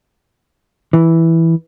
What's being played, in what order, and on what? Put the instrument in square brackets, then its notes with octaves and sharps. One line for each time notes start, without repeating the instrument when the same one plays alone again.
[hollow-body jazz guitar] E3